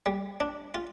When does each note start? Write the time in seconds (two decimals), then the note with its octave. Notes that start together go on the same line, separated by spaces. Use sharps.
0.06 G3
0.40 D4
0.74 F4